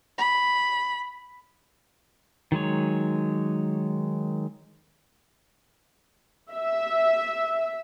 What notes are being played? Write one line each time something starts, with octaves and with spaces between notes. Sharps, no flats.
B5
D#3 F#3 G#3 C#5
E5